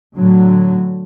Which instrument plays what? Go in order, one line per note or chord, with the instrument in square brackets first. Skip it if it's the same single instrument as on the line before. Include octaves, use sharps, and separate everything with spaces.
[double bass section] A2 D3 F#3